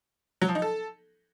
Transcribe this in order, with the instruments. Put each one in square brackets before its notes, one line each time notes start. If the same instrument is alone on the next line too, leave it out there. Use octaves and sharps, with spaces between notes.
[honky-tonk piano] F#3
F3
D#4
A4